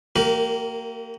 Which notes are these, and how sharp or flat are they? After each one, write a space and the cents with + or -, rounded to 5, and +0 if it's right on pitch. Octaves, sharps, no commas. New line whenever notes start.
A#3 -30 G4 -30 A#4 +0